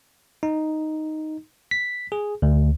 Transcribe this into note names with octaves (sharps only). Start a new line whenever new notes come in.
D#4
B6
G#4
D2